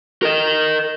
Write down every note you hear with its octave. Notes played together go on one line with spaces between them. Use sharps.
A#4 D#5